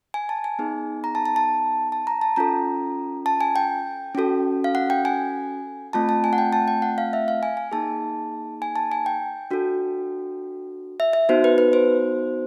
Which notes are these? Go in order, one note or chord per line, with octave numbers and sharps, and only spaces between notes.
G#5
A5
G#5
B3 D#4 G#4
A#5
A5
A5
A5
A5
A#5
A5
C#4 F4 A4 A#5
A5
G#5
G5
C#4 F#4 A4
F5
F#5
G5
G#5
A3 C4 F4 A5
A5
G#5
F#5
G5
A5
G5
F#5
F5
E5
F5
G#5
G#5
A#3 D#4 G#4 A5
G#5
A5
G#5
G5
D4 F#4 A4
E5
E5
B3 D#4 F#4 C5
B4
B4
C5